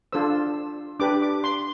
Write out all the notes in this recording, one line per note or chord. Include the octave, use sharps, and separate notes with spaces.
D4 F4 A4 C5 E6
D4 G4 B4 D6
D6
C6